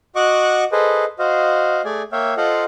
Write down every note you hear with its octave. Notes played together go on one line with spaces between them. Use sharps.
F#4 D#5 F#5 C#6 D6 F#6
G#4 A4 B4 C5 D#5
F#4 C5 D#5 F5
A3 G#4 D5 G#5
A#3 C#5 E5 F5 G5
F4 A4 C5 D#5 F5 F#5